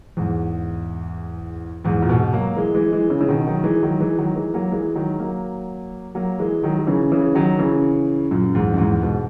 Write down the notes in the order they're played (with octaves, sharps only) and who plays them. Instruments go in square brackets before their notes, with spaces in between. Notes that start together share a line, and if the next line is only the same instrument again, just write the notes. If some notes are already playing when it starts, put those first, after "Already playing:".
[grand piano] E2 G#2
E2 G#2
A#2
G#2 B2
F#3 A#3
E3 G#3
E3 G#3
E3 G#3
C#3 E3
C#3
B2 D#3
D#3 F#3
E3 G#3
D#3 F#3
E3 G#3
D#3 F#3
E3 G#3
F#3 A#3
E3 G#3
D#3 F#3
F#3 A#3
F#3 A#3
E3 G#3
D#3 F#3
F#3
C#3 E3
C#3 E3
D#3 F#3
C#3 E3
F#2 A#2
E2 G#2
F#2
E2 G#2
G#2 B2